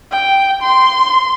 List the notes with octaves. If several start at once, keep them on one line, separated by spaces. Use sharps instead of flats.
G5
C6